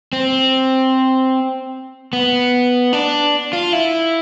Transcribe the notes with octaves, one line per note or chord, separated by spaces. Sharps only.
C4
B3
D4
F4
E4